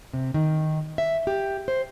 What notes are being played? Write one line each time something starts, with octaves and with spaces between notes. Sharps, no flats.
C3
D#3
E5
G4
C5